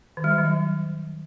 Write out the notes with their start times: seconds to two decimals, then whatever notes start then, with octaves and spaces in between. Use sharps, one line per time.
0.17 D#3
0.24 G3
0.31 F#3
0.38 D#3
0.45 F#3